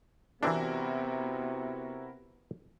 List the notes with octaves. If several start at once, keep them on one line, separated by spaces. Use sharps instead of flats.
C3 E3 B3 C4 D4 E4 F#4 A#4